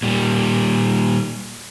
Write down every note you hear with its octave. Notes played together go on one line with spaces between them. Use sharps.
A#2 G3